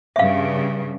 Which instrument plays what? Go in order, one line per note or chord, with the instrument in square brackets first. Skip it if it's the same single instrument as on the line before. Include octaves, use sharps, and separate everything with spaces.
[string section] G2 C#3 [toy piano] E5 F5